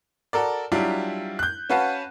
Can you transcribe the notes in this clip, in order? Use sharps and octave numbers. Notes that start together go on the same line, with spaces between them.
F#4 A4 A#4 D5
F#3 G3 D4 E4 F4 G4
F#6 G6
C#4 F#4 B4 F5 F#5 A5